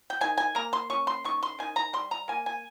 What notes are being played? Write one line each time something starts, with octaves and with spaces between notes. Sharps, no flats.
G5
D#3 G#5
G#5
A#3 A#5
C6
C#4 C#6
C6
D#3 C#6
C6
D#3 G#5
A#5
G3 C6
A#5
A#3 G#5
G#5